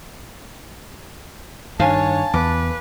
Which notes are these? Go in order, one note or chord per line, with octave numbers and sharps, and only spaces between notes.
G2 D#3 D4 C#5 F5 G#5 A5
E2 B4 D6